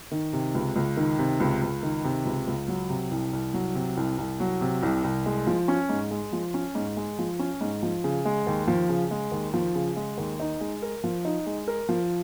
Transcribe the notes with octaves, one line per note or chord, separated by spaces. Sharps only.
D#3
C3
C#2
C#2
D#3
C3
C#2
C#2
D#3
C3
C#2
C#2
F#3
C3
C2
C2
F#3
C3
C2
C2
F#3
C3
C2
C2
G#3
F3
C#4
G#2
G#3
F3
C#4
G#2
G#3
F3
C#4
G#2
F3
C#3
G#3
D#2
F3
C#3
G#3
D#2
F3
C#3
G#3
D#2
D#4
G#3
A#4
F3
D#4
G#3
A#4
F3